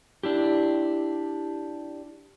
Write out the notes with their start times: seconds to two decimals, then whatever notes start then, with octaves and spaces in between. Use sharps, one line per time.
0.23 D4 E4 G4